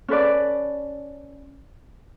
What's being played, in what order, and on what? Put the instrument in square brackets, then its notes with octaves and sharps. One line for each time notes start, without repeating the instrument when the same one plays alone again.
[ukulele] C#4 A4 B4 D5